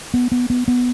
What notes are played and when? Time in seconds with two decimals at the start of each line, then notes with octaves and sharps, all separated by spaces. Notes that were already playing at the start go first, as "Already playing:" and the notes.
0.14 B3
0.32 B3
0.50 B3
0.68 B3